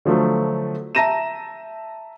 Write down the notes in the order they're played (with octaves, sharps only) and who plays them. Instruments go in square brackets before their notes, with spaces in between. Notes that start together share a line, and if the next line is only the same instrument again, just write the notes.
[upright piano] D3 F3 F#3 A3
E5 A5 A#5 A#6 D#7 E7